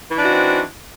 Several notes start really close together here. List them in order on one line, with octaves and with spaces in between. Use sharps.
E3 D4 D#4 F#4 C4